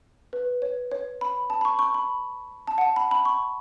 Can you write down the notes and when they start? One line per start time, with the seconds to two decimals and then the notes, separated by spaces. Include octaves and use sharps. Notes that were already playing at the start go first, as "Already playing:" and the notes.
0.33 B4
0.62 C#5
0.91 C#5
1.21 B5
1.50 A5
1.61 B5
1.65 C#6
1.79 C#6
1.94 B5
2.68 A5
2.78 F#5
2.81 A5
2.96 B5
3.11 B5
3.25 C#6